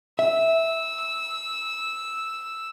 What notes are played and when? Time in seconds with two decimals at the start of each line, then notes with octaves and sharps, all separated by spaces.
0.19 E5 E6